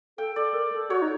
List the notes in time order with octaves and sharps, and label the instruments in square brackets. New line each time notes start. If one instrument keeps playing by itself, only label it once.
[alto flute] A4 [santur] G5
[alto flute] A4 [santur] D5
[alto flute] A#4
A4
[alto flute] F#4 [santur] C#5
[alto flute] D#4